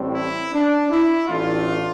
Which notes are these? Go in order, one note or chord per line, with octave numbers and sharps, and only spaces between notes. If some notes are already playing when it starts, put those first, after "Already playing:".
Already playing: A1 A2 G3 C4
E4
D4
E4
A1 A2 E3 A3 D4 F4